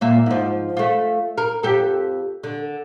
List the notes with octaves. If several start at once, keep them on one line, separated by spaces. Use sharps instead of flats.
A#2 A#3 E5
G#2 F3
A3 F4
A#4
F2 G4 A4
D3